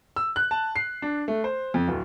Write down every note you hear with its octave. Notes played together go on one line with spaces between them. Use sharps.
E6
F#6
A5
C7
D4
A3
C5
F2
D1